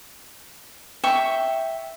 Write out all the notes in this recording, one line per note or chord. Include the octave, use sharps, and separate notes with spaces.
E5 G5 C#6